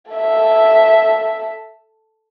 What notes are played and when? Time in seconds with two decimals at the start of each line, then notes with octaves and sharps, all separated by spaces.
0.12 A4 E5